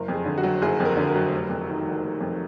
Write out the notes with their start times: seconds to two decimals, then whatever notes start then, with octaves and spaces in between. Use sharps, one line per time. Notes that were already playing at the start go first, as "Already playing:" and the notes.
Already playing: F#1 A#4
0.08 F2
0.14 G#4
0.26 D3
0.38 F#4
0.43 F#3
0.62 F#1 G#4
0.80 F2
0.85 A#4
0.97 D3
1.09 A#4
1.15 F#3
1.32 F1
1.50 F2
1.68 D#3
1.86 F1
2.03 F1
2.21 F2